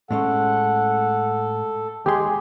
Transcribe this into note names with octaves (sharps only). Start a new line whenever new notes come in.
A2 G#3 C#4 A4 F#5
D#2 G#3 G4 G#4 C6